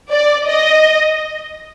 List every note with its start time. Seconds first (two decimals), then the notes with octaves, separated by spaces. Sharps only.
0.11 D5
0.49 D#5